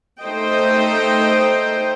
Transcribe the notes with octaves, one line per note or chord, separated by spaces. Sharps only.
A3 D#4 C5 D#5 G5